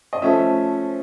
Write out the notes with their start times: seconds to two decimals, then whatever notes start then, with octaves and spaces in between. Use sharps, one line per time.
0.13 D#5
0.22 F3 A3 C#4 E5